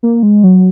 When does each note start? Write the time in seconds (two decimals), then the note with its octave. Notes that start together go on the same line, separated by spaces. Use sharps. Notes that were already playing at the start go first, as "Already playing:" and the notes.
0.03 A#3
0.23 G#3
0.44 F#3